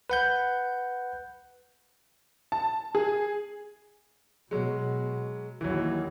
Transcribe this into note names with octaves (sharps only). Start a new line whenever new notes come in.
B4 F#5 G6
A5
G#4
B2 F#3 G#3
D#2 E3 F#3